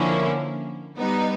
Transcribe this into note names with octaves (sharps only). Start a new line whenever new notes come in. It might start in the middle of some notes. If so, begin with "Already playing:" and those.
Already playing: D3 F3 A#3 C#4 E4
G3 B3 D#4